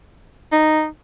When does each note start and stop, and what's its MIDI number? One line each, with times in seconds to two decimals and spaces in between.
0.52 0.86 63